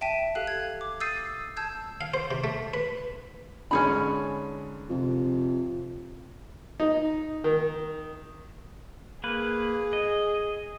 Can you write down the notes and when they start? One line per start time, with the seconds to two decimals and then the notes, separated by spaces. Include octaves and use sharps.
0.01 E5 G5 A5 B6 D#7
0.35 G4 A4 F5 F#6
0.47 G#6
0.81 D6
1.00 D#6 E6 G6 A6 C7 D#7
1.57 A5 E6 G6 G#6
2.01 F5
2.14 C5
2.31 C3
2.44 A3
2.74 B4
3.71 G#2 D3 C#4 D#4 B5
4.89 F2 C3
6.80 D#4
7.44 D#3
9.24 A#3 G#4 B4
9.93 D#5